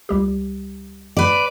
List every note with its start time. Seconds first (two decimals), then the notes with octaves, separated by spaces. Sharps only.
0.09 C#2 G3 G4
1.17 B4 D5